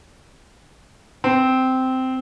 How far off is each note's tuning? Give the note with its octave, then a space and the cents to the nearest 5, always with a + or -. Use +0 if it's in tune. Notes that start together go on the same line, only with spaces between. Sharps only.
C4 -10